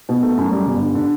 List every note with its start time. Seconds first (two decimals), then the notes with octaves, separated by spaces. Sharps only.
0.09 B2
0.23 A3
0.37 F#2
0.51 G3
0.66 G1
0.82 D3
0.95 D3